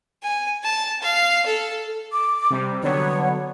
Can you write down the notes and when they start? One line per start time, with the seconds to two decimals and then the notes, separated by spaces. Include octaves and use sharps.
0.23 G#5
0.63 A5
1.02 F5
1.46 A4
2.12 D6
2.50 C3 G3
2.83 D3 F#3 B3 C#5